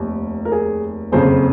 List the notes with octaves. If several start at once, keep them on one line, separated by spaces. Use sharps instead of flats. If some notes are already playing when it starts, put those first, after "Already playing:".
Already playing: F1 D#2
A#4
G#4
F#1 F2 C#3 G#4 C5